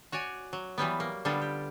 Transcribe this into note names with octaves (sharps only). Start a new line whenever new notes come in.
F#4 C#5 D5 G#5
F#3
E3 F#3 G3 B3
A#3
D3 G3 B3 F4 A4
G4